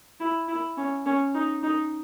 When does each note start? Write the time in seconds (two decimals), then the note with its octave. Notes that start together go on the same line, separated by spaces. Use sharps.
0.20 E4
0.48 E4
0.77 C#4
1.06 C#4
1.34 D#4
1.63 D#4